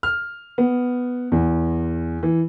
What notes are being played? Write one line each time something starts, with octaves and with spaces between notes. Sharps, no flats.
F6
B3
E2
E3